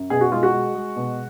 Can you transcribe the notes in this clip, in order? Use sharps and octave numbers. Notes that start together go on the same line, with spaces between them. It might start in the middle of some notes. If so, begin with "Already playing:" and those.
Already playing: F#2
B2 G#4
F#4
G#3 F4
F#4
G#3
G#3
B2